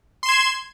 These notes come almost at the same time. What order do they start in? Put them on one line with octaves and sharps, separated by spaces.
C6 E7 G#6